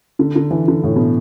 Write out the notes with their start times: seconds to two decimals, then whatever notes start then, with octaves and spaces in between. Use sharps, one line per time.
0.19 D3
0.36 D3
0.51 E3
0.68 D3
0.84 A2
0.96 B2